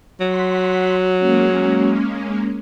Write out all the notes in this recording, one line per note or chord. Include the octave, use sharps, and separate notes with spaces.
F#3 F#5 C6 B6
G#3 A#3 C#4